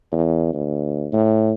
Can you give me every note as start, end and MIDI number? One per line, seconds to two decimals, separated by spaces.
0.12 0.51 40
0.53 1.07 38
1.12 1.53 45